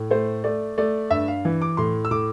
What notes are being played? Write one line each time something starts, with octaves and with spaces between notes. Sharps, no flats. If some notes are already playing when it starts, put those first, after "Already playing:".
Already playing: A2
A3 C5
A3 D5
A3 D5
G2 E5
F5
E3
D6
A2 C6
E6
A2 D6